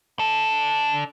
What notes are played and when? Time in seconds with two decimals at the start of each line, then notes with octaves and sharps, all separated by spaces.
0.19 D4 A4